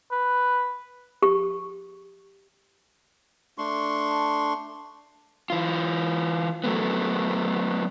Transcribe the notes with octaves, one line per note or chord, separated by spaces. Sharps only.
B4
G4 C#6
A3 D4 C6 C#6
E3 F4
F#3 A3 B3